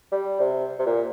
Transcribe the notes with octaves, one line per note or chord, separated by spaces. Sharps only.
G3
C3
C3
A#2